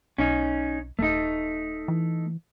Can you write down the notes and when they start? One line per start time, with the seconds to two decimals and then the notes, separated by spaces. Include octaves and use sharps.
0.18 B1 C#4 D#4
0.99 D#1 A3 D#4
1.88 E3